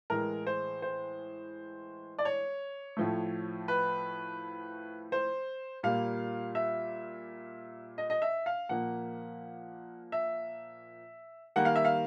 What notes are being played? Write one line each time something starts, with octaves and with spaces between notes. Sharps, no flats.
A2 E3 G#3 A#4
C5
C5
D5
C#5
A2 F3 A3
B4
C5
A#2 G3 A#3 F5
E5
D#5
D#5
E5
F5
A#2 F3 A#3 F#5
E5
D#3 G3 A#3 F#5
F5
E5
F5